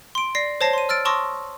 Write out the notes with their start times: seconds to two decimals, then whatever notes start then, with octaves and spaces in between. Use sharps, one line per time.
0.15 C6 D7
0.35 D5 A#6 C7
0.61 C5 C#5 A5 A#6 C7
0.73 C6 D#7
0.89 E6 F6 A6 D7
1.05 A5 C6 C#6 D#6 E6 A#6